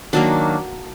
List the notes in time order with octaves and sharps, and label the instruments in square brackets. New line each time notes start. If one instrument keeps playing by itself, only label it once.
[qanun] D#3 F#3 A#3 D4